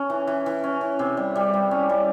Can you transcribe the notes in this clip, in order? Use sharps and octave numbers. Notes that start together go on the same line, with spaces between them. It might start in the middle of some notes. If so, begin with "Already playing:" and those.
Already playing: C#4
E3
E3
E3
C#4
E3
C3
G3
G3
G3
C#4
G3